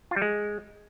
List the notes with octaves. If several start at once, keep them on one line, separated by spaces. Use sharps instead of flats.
F4
G3
G#3